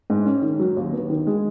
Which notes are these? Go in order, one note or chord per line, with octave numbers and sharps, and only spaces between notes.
G#2
C#4
D#3
F#3
D#2
B3
D#3
G#3